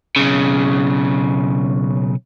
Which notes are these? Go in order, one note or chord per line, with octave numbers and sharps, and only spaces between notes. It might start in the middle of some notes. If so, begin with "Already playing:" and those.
B1 C#3